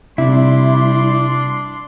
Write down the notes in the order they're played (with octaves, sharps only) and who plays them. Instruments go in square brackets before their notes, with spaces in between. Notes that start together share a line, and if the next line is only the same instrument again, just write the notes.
[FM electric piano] C3 [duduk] G3 [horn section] D4 D5 C6 [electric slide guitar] E4